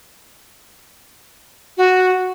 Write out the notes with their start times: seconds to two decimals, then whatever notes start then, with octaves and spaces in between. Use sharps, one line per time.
1.77 F#4